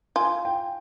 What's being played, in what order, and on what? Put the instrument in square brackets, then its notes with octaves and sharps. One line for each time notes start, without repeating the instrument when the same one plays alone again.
[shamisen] F4 [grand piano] G#5
[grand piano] G5